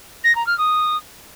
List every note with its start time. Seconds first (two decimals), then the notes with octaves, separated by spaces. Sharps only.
0.24 A#6
0.35 A#5
0.47 F6
0.58 D#6